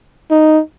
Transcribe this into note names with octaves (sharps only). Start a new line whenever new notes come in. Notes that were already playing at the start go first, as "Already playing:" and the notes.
D#4